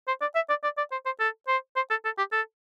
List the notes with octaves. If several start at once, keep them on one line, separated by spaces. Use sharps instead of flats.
C5
D5
E5
D5
D5
D5
C5
C5
A4
C5
C5
A4
A4
G4
A4